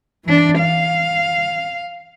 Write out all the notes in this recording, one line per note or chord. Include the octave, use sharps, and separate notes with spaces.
E3 D4
F5